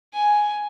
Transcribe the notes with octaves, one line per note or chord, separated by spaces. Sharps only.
G#5